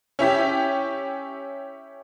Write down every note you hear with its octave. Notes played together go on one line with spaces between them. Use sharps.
C#4 E4 G4